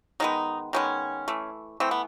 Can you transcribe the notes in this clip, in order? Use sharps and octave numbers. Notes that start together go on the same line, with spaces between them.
D#3 G#3 B3 D#4
D#3 G#3 B3 C#4
E3 A3
E3 A3 C4
B3